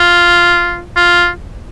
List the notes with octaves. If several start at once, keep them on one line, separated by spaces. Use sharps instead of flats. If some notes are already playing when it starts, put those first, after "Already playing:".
Already playing: F4
F4